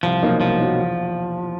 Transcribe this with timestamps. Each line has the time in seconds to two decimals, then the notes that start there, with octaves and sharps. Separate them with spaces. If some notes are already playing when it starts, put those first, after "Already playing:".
0.03 C2 F3
0.22 B2 F#3 A#3 D#4
0.41 C2 F3
0.59 B2 F#3 A#3 D#4
0.78 E2